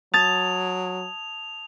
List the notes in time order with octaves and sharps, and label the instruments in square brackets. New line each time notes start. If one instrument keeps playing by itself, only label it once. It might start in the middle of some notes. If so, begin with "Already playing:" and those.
[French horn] F#3 [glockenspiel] A5 D#6 G#6 [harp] A6 [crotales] F7